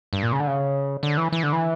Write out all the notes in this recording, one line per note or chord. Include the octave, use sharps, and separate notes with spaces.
G2
A#2
C#3
D3
C#3
D3
E3
E3
D3
E3